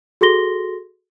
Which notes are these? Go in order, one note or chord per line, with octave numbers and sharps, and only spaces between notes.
F#4 G#4 A4 C6 A#6 G7